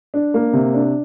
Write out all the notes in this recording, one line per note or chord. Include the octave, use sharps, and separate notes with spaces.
D4
A#3
C3
D4